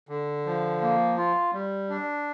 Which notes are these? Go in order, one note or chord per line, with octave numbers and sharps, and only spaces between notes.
D3
F3
A#3
F4
G3
D4